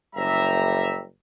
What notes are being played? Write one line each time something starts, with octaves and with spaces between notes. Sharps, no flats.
F#1 G3 E5 A#5